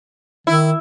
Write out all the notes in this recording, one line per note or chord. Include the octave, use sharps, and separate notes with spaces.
D#3 E4